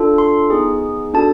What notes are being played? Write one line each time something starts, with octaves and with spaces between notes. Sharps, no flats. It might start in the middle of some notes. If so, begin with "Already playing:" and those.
Already playing: D4 F4 A4
C6
B3 D#4 G#4
D4 F#4 A4 A5